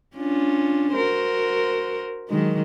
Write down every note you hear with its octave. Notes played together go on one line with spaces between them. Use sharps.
C#4 D4 F4
F#4 A#4 C5
D#3 F#3 G#3